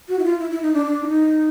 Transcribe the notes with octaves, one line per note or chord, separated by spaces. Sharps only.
F#4
E4
F4
E4
E4
D#4
D4
D4
E4
D#4